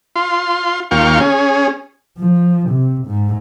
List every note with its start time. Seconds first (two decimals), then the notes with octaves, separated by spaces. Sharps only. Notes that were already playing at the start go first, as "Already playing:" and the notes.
0.16 F4 C6
0.91 D#2 A#3 F4 F5 G5 C#6
1.20 C#4 G#4
2.18 F3
2.69 C3
3.06 G#2